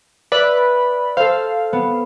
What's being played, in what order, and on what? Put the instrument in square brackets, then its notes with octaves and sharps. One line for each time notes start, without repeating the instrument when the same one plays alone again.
[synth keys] B4 D5 B5 [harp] E5
[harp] A4 C5 [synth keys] F5
[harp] B3